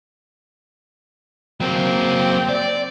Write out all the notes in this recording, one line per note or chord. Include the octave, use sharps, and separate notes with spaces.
F#3 A#3 C4
D5